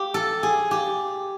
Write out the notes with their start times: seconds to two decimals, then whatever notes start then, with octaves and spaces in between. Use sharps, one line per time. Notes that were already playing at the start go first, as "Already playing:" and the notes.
Already playing: G4
0.14 A4
0.43 G#4
0.71 G4